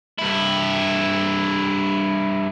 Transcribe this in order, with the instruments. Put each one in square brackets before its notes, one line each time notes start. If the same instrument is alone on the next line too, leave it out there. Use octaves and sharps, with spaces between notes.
[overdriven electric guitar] G2 E4